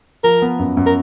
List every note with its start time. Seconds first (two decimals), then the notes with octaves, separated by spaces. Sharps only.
0.24 F3 A#4
0.42 B3
0.59 F#2
0.77 F#2
0.87 A#4